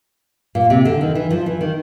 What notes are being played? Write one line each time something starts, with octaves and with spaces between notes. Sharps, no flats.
A#2
C3
D3
D#3
E3
F3
E3
D#3